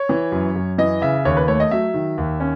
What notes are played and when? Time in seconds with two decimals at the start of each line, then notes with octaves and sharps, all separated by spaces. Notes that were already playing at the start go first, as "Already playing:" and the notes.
Already playing: C#5
0.09 E3
0.32 F#2
0.56 F#2
0.78 E3 D#5
1.02 C#3 E5
1.25 D#2 C#5
1.37 B4
1.48 A3 C#5
1.60 D#5
1.71 F#3 E5
1.94 D#3
2.18 D#2
2.40 C#4